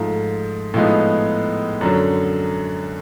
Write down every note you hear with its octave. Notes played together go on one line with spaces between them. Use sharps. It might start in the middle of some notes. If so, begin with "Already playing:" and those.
Already playing: G#2 F3 A3
A2 F3 G#3 B3 D#4
F#2 D3 F#3